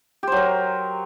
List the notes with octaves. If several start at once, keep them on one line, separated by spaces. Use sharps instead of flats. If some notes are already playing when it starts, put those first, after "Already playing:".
F#3 G4 A#4 C5